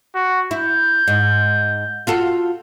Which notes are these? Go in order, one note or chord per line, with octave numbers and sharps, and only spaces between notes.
F#4
E4 G6
G#2
F4 F#4 A4